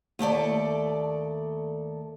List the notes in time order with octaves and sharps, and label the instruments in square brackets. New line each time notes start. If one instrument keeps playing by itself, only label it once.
[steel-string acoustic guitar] D#2 A3 A4 D5